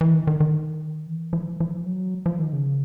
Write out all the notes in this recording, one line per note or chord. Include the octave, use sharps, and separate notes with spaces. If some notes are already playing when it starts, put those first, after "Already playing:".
E3
D#3
D#3
D#3
E3
F3
F3
F#3
F3
D#3
C#3